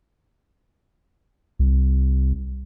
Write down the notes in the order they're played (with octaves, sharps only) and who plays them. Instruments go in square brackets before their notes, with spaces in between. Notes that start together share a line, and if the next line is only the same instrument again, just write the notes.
[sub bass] C2